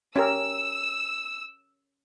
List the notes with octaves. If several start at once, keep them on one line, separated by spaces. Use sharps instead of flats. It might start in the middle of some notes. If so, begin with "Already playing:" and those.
C#4 G4 A#4 E6